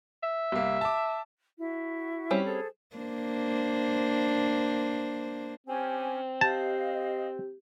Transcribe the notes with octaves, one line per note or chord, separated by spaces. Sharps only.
E5
C2 A#3
A5 D6
E4 F#4
G3 C4 C#4
G#4 A4 C5
A#3 D4 C5
C4 C#4 G4 G#5
G4 D#5 F5 A5